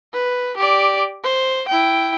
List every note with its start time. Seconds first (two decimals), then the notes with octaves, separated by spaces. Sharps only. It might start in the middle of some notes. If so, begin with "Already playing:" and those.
0.13 B4
0.57 G4 D5
1.24 C5
1.68 E4 G5